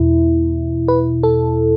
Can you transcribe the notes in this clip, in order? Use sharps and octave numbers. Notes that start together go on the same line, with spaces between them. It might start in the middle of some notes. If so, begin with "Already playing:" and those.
Already playing: E2 B2 E4
B4
A4